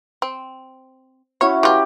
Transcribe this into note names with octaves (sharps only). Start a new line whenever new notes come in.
C4
C#4 E4 F#4 C#5
E3 F4 G4 A#5